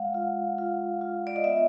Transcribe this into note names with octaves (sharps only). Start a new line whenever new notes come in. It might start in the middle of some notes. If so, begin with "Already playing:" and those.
Already playing: G#3 F5 F#5
F4
F4
F4
D5
D#5
B3 E5